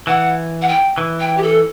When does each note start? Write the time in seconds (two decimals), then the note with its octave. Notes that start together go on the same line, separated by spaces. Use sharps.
0.07 E3 F#5
0.62 F#5
0.68 G5
0.98 E3
1.20 G5
1.37 G4
1.42 A4